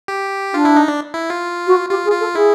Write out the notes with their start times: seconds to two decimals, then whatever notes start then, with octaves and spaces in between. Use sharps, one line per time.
0.08 G4
0.54 D4 F4
0.65 E4
0.76 D#4
0.88 D4
1.14 E4
1.30 F4
1.67 F#4
1.90 F4 G4
2.05 G#4
2.12 F4
2.20 A4
2.35 E4 G#4